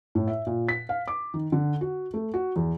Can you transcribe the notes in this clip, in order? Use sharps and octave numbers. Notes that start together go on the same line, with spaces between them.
A2
E5
A#2
B6
F5
D6
D#3
D3
F#4
A3
F#4
E2